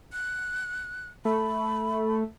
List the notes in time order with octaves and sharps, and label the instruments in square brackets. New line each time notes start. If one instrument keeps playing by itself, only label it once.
[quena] F#6
[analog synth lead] A3 [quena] B5